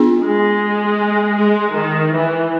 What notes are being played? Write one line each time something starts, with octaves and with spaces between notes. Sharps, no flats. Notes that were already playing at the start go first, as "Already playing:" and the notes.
Already playing: B3 D4 F4 G#4
G#3
G#3
D#3
E3